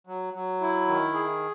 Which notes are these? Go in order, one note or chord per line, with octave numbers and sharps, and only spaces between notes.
F#3
F#3
E4
D#3
G#4